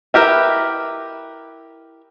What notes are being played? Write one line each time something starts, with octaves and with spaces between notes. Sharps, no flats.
E4 G4 A#4 B4